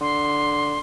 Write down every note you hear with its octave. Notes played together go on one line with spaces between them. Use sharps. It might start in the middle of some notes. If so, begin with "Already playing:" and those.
D3 C6